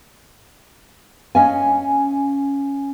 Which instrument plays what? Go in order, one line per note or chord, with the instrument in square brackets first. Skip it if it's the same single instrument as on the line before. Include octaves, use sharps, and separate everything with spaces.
[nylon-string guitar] C#4 D#5 F5 G#5